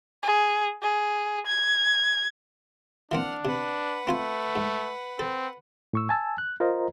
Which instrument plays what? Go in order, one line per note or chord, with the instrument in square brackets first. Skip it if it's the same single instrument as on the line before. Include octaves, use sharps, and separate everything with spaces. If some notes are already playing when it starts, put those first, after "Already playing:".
[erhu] G#4
G#4
G#6
[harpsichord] E3 A#3 C4 [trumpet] D4 [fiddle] F#5 F6
[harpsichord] C3 [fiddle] B4 F#5
[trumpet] A3 [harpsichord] C4 F4 G#5
[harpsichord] G#2
[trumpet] C4 [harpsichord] A4
[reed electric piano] A2 C#6 E6
G#5 A5 E6
F#6
F4 A#4 C5 D#5 A#5